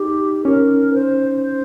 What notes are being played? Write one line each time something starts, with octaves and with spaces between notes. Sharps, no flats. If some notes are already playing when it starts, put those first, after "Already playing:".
Already playing: D#4 G4
C#4 A#4
C5